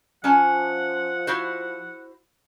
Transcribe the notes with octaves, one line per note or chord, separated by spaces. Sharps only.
F3 C#4 F#5 G#5 A5
E4 F#4 C5